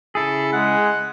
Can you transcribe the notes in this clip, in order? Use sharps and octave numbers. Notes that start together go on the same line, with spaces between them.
C#3 E4 G#4 A4
G#3 F#5